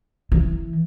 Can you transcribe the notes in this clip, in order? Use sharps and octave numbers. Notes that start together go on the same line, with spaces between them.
E3